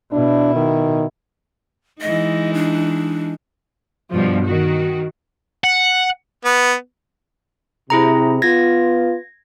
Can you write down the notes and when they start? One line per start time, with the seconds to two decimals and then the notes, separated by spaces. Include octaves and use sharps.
0.12 B2 D4 E4
0.55 D#3
2.01 E3 G#3 D#4 D#5
2.54 D4
4.12 G2 B2 F3
4.45 D#3 F#4
5.64 F#5
6.45 B3
7.90 C3 E4 G#4 A#5
8.42 B3 F4 G#6 A#6